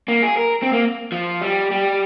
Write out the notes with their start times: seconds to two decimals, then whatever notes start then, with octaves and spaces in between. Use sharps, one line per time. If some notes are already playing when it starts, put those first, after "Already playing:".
0.08 A#3
0.23 G#4
0.37 A#4
0.62 C4
0.73 A#3
1.12 F3
1.41 G3
1.71 G3